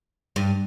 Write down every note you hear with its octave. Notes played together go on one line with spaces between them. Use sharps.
G2